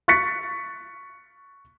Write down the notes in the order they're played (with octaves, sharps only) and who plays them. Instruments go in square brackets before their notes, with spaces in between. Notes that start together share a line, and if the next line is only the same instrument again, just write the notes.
[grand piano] C#6 F#6 A6 B6 C#7